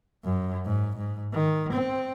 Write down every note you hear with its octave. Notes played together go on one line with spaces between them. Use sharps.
F#2
G#2
G#2
D#3
C4